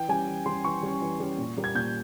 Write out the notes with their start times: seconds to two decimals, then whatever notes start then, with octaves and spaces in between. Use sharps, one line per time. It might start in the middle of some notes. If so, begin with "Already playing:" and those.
Already playing: E3 G5
0.09 G3 C#4 G#5
0.27 E3
0.46 G3 C#4 C6
0.64 E3 C#6
0.83 G3 C#4
1.01 E3
1.20 G3 C#4
1.38 A#2
1.57 G3 A#3
1.64 G#6
1.75 A#2 G6